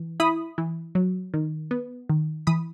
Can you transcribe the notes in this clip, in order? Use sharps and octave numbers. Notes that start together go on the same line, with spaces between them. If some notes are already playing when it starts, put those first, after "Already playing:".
Already playing: E3
E4 B5 D#6
E3
F#3
D#3
B3
D#3
E3 B5 D#6